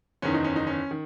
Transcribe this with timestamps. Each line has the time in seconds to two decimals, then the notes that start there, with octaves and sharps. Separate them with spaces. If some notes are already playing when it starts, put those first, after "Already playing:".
0.22 F#1 E2 D#3 C#4
0.34 D#4
0.44 C#4
0.56 D#4
0.67 C#4
0.91 D#3